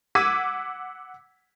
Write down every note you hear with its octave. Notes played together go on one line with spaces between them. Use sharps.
F#5 D6 E6 G#6 B6 D#7